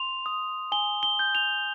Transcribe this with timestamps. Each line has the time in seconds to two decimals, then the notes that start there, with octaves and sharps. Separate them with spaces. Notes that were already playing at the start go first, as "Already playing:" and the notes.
Already playing: C6 F7
0.26 D#6
0.72 G#5 G7
1.03 G7
1.19 G6
1.35 F7